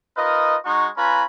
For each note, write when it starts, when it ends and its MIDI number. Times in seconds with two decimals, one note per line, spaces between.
0.17 0.56 63
0.17 0.56 65
0.17 0.56 70
0.17 0.56 71
0.17 0.56 75
0.65 0.89 56
0.65 0.89 63
0.65 0.89 66
0.65 0.89 85
0.97 1.24 61
0.97 1.24 65
0.97 1.24 71
0.97 1.24 80
0.97 1.24 82
0.97 1.24 83